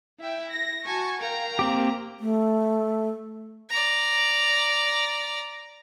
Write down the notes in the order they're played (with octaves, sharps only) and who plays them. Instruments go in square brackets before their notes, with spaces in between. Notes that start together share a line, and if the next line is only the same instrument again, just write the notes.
[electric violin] E4 [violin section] E5 G5
[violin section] A#6
[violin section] F#4 A5 C#6 [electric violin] G#5
[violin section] A#4 F5 G5 [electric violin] A#5
[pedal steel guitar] A#3 C4 G4
[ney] A3
[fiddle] D5 A#5